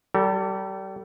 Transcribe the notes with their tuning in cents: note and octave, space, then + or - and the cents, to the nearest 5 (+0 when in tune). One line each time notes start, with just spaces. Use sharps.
G3 -25 A4 +30